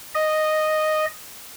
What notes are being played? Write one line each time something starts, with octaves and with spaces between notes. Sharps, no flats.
D#5